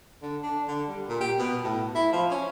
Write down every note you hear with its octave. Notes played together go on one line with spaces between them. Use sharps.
D3
D4
D3
G3
A#2
G4
B2
A2
E4
F3
C#4